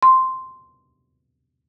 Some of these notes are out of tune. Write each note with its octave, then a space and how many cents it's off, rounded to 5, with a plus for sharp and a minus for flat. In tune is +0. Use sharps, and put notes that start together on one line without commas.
C6 -5